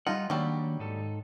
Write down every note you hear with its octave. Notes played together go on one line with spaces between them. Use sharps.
G3 D#4 F4 F#5
D#3 F#3 G3 A#3 D4
G#2 D#4 A4